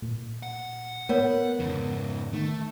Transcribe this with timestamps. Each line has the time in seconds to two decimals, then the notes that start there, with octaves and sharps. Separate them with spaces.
0.02 A#2
0.43 F#5
1.09 B3 A#4 C#5
1.59 F2 G#2 C#3
2.33 D#3 A3